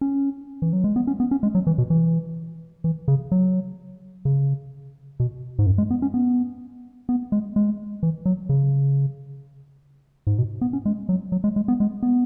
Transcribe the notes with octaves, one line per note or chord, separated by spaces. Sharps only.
C#4
E3
F#3
G#3
B3
C#4
B3
C#4
G#3
F#3
E3
B2
E3
E3
C#3
F#3
C#3
B2
G#2
F#2
G#3
B3
C#4
B3
B3
G#3
G#3
E3
F#3
C#3
G#2
B2
B3
C#4
G#3
F#3
F#3
G#3
G#3
B3
G#3
B3